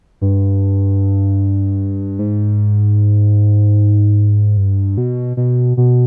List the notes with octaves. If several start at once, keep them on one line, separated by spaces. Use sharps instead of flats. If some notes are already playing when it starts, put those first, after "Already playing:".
G2
G#2
G2
B2
B2
B2